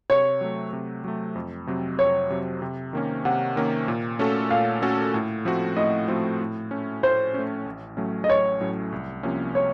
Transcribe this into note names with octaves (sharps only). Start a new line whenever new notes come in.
C3 C#5
F#3 A3
C3
F#3 A3
F2
C3 F#3 C4
F2 C#5
C3 F#3 C4
C3
D#3 A#3 C#4
C3 F#5
D#3 A#3 C#4
A#2
A3 C#4 F#4 A4
A#2 F5
A3 C#4 F#4 A4
A2
F3 A3 C4 F#4
A2 D#5
F3 A3 C4 F#4
A2
A3 C#4
A2 C5
A3 C#4
A1
A2 F#3 A3 C#4
D#5
A1 C#5
A2 F#3 A3 C#4
C2
C3 F3 A#3 C#4
C#5